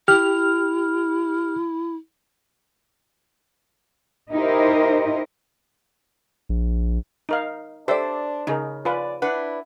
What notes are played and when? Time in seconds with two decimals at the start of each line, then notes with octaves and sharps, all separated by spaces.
0.08 E4 G4 F6
4.32 D#4 E4 G4 A#4 C5 D#5
6.49 A#1
7.29 D#4 A#4 F5
7.88 D4 G4 A4 C5 D5 E5
8.47 C#3 D#4 G#4 A#4
8.85 F4 B4 D5 G#5
9.22 D4 E4 B4 F#5